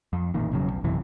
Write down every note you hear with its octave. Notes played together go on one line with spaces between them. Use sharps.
F2
A1 A#2 D#3
E1 C#3 F#3
B1
A#1 F#2 C3 E3